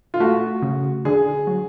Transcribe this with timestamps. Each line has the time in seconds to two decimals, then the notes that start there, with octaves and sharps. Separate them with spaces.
0.14 F4
0.20 A3 F#4
0.62 C#3
1.05 D3 G#4
1.47 F#3